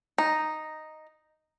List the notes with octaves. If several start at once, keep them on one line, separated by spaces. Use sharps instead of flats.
D#4